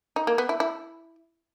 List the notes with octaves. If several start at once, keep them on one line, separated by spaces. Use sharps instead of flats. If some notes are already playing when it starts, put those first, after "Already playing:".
D#4
A#3
B3
E4
E4